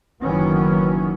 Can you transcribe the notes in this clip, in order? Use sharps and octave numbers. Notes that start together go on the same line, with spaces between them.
F#1 D#3 E3 F#3 B3 C#4